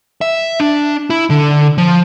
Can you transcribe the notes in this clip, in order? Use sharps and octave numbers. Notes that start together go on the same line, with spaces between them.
E5
D4
E4
D3
F3